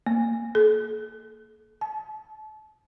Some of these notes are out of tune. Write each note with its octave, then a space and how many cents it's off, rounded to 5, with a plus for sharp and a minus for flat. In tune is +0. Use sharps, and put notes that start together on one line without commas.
A#3 -20
A4 -45
A5 -35